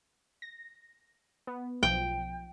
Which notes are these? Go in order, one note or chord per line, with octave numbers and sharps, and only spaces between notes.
A#6
B3
B1 F3 G5